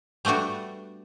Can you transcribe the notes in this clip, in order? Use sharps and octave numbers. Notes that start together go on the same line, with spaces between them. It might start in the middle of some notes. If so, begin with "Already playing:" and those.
G3 A3 B3 D4 F#4